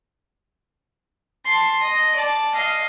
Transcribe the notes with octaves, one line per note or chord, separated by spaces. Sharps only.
A5 C6
D#5
D5 A5
D#5 F5